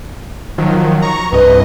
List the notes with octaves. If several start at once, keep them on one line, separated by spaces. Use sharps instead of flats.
D#3 F3 F#3
A#5 C#6
C2 G2 B4 D#5